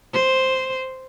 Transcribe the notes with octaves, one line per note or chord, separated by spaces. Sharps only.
C5